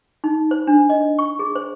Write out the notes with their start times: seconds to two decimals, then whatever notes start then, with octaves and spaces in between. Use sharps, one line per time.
0.24 D#4
0.51 C5
0.67 D4
0.89 D#5
1.19 C#6
1.39 G#4
1.55 C5